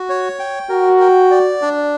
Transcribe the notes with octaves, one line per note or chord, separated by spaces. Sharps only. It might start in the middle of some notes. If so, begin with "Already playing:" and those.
Already playing: F#4
C#5
G5
F#4 A#4
G5
D5
D4